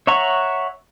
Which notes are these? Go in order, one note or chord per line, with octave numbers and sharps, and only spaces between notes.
C#5 E5 F#5 A#5 C#6